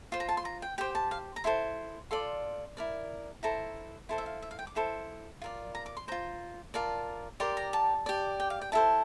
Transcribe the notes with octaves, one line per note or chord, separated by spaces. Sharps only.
F4 C5 C6
A#5
A5
C6
A#5
G5
G4 C5 G5
A5
F5
A#5
E4 A4 C5 C6
F4 A4 D5 C6
E4 A#4 D5
E4 A4 C5 A#5
E4 A4 C5 C6
E5
F5
E5
F5
G5
D6
E4 A4 C5 C6
F4 A#4 D5
A#5
D6
C6
F4 C5 A#5
F4 A#4 D5 A5
G4 A#4 D5 C6
A#5
A5
G4 D5
G5
F5
G5
E4 A4 C5 A5